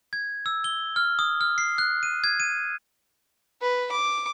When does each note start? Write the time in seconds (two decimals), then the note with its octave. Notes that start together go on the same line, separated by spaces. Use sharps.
0.13 G#6
0.46 E6
0.64 G7
0.96 F6
1.19 D#6
1.41 F6
1.58 C7
1.78 F#6
2.03 D#7
2.24 G#6
2.40 D#7
3.61 B4
3.91 D6